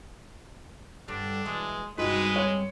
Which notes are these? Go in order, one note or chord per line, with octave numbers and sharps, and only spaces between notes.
G2 D3 G3 D4
B2 E3 G#3
G2 C3 G#3 D#4 F#4 B4
C#5